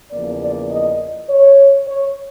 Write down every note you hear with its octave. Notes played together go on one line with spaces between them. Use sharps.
E2 C#3 F3 A#3 D5
D5
D#5
C#5
C#5